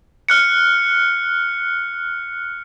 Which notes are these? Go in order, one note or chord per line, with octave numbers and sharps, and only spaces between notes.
F6 F#6 C#7